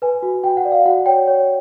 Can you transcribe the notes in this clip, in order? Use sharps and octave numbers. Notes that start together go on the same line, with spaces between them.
B4 G#5
F#4
F#4 G5
F#5
D5
F5
F#4 F#5
C#5 G5
C#5